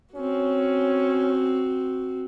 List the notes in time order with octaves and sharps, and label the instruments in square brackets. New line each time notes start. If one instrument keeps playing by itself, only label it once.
[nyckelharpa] C4 F#4 [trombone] C#4